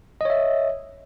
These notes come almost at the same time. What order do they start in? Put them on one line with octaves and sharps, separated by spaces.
D#5 C#5 E5